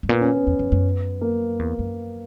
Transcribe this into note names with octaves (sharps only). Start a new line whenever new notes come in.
G2
A#2 B3
C#4
B3
E2
F#2
F#2
A#3
E2
F#2